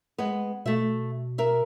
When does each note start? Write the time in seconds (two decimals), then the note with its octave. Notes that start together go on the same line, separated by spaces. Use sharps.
0.18 G#3 B3
0.66 B2 A3 E5
1.38 A#4 E5